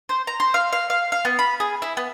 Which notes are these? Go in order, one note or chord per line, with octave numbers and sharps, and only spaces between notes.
C5
A#5
C5
F5
F5
F5
F5
B3
B5
G#4
E4
B3